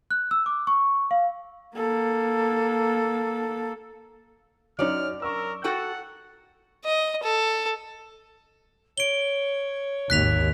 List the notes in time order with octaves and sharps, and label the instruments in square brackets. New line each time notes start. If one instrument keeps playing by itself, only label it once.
[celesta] F#6
E6
D6
C#6
F5
[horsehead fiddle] A#3 A4
[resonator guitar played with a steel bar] F#2 D5 [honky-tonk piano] F#3 C#4 D#4 [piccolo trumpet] F6
[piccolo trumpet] A#4 [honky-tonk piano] C#6 E6
[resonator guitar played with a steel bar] F#4 A4 G5 [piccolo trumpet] F#5
[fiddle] D#5
A4
[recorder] C#5 [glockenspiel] D7 G7
[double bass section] G#1 D#2 [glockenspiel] F#6 B6 F7